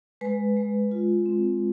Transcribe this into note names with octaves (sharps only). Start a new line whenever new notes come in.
G#3 B4
G#3
F4
C4